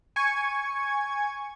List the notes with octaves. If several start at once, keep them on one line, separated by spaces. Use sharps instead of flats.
G#5 C#6 G#6